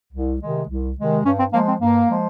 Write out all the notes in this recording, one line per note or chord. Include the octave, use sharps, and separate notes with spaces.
C2
C3 D#3 G#3
C2
C3 D#3 G#3
G2 C#4
C4
F3 G#3 A#3
C4
G2 A#3
F3 G#3